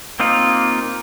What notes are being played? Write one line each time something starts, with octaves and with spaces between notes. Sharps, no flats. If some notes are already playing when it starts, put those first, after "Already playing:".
A#3 C4 D#4 F4